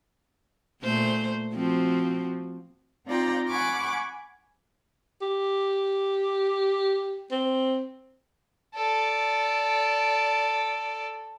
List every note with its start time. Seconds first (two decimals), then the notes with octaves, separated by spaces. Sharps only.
0.83 A#2 A3 C5
1.54 F3 C4 F#4
3.06 C4 D#4 F4 D5 G5 A#5
3.49 F#5 G#5 B5 C#6 D6 F6
5.22 G4
7.31 C4
8.75 A4 D5